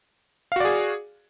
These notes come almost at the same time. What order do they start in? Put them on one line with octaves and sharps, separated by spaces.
F5 F#4 D5 G#4